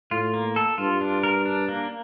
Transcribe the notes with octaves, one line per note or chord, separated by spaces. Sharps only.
A2 F4
A#3
A4
G2 F4
D4
A#4
D4
A#3